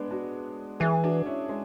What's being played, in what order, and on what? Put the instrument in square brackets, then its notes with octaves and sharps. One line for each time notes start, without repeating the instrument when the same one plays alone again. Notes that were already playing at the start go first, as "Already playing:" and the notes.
Already playing: [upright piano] G#3 B3 D4
D4 F#4
[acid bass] E3 [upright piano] E4 G#4
[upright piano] D4 F#4
C#4 E4
G#3